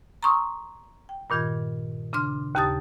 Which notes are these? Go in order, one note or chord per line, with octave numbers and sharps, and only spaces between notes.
A#5 C6 C#6 D#6 E6
G5
G2 A#2 D#3 F4 G#6
C#3 D4 C6 D6 F6
D#2 C#3 G4 A5 D#6 A6